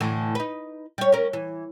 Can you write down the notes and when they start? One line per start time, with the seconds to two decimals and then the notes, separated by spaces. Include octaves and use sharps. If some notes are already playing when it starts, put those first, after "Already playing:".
0.01 A2 D3 E3
0.35 D#4 B4
0.98 G3 C#5
1.12 C#4 A#4
1.33 E3